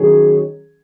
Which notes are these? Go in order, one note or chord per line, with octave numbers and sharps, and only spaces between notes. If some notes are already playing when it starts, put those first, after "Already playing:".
Already playing: D#3 F#3 C#4 G#4 C#5